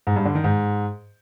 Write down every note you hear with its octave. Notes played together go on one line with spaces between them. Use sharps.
G#2
G2
D3
D#3
G#2